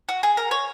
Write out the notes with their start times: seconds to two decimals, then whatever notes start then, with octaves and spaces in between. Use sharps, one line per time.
0.09 F#4
0.23 G#4
0.37 A#4
0.51 C#5